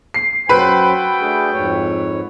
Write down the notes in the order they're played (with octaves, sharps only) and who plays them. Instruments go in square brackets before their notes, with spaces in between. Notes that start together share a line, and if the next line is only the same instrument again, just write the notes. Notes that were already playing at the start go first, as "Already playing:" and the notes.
[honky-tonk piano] C7
[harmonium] F#2 F#3 C5 [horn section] F#4 A4 G5 [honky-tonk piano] B4 B5
[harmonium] A3 D4 G#4
F2 G#2 C#5